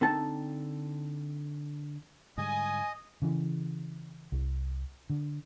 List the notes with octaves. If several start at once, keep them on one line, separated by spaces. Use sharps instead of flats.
D3 C4 D#4 A4 A5
G#2 D3 G3 D#5 G#5 D#6
C#3 E3
C2
D3